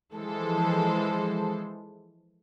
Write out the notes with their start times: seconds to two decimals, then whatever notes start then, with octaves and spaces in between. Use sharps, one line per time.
0.15 E3 F3 G#3 A4 C5